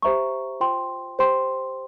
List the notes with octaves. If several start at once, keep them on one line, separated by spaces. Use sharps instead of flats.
G4 C5 E5 A#5 C#6
F4 C5 G5 C6
G4 C5 G5 C6